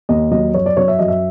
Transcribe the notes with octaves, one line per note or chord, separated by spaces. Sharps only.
D#2 D#5
F#3 D#5
F#2 C#5
D5
F#3 C#5
E5
F#2 D#5
E5